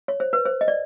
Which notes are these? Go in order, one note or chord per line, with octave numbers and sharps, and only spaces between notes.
C#5
C5
B4
C5
D#5
D5